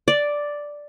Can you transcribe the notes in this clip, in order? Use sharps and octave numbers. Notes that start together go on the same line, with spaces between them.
D5